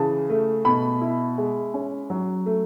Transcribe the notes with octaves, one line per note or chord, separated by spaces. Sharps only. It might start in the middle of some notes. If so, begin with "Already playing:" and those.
Already playing: C#3 E3 A5
A3
B2 B5
E4
G#3
C#4
F#3
A3